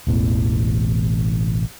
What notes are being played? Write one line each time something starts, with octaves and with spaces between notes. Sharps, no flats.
E1 A1 E2